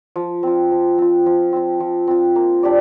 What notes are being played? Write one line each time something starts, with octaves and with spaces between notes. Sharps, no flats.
F3
C4 F4
F3
C4 F4
F3
C4 F4
F3
C4 F4
A#3
D4 G4 D5